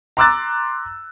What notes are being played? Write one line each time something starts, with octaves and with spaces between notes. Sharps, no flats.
A#5 C6 D6 E6 F#6 A6